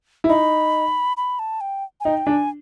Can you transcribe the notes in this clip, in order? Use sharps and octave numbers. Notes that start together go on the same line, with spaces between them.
E4
D#4 B5
B5
A5
G5
G#5
D#4 G5
D4 G#5